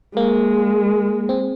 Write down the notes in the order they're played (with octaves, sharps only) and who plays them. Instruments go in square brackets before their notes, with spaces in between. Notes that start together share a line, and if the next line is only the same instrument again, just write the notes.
[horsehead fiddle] G#3 [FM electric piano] A#3
[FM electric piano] C4